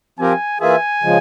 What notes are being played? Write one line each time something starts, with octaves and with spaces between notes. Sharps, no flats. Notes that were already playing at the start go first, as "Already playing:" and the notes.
F3 C4 G4 A#4 G#5
E3 A#3 F4 G#4 E5 G#5
C#3 F3 G#3